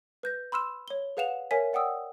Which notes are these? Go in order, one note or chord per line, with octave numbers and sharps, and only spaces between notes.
B4 G6 A#6
B5 C6 E6 F6 E7
C#5 G7
G#4 B4 F5 F#5 E7 F7
A#4 C#5 E5 G#5 B6
D5 F#5 G5 D#6 E6